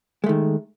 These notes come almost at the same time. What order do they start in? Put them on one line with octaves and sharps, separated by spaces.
G#3 A3 D#3